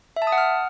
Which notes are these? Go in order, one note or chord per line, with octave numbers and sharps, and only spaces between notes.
E5
A5
D#6
F#5
F6